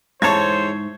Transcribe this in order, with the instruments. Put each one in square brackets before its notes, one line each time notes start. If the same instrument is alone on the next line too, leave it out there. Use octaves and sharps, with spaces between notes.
[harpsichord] E2 A4 C#5 [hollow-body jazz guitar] G#2 A5 [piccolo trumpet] C5 [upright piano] C#6 G#6